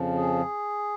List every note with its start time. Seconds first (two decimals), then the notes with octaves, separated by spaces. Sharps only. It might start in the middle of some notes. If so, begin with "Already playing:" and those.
Already playing: F2 C#3 F3
0.15 G#4